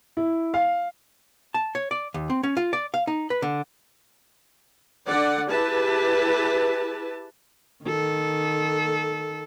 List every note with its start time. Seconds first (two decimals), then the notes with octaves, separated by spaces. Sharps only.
0.17 E4
0.54 F5
1.54 A5
1.75 C#5
1.91 D5
2.14 D#2
2.30 C4
2.43 C#4
2.57 F4
2.73 D5
2.94 F5
3.07 D#4
3.30 B4
3.42 D3
5.07 D3 D5 F#5
5.49 E4 G4 G#4 B4 A5
7.84 D#3 A4